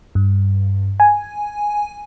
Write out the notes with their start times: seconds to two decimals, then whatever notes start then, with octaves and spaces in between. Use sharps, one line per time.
0.15 G2
1.00 G#5